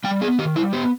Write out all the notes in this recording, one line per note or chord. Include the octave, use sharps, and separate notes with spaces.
G3 G5
B3 G#4
D#3 G4
G3 E4
B3 G4